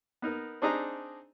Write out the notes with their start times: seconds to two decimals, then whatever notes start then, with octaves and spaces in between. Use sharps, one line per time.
0.22 B3 D#4 A#4
0.62 C4 D4 D#4 G#4 D#5 A#5